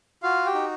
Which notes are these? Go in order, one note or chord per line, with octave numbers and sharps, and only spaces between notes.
F4 F#4 F5
G4 G5
D#4